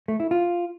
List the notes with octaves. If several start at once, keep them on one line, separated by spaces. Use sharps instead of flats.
A3
E4
F4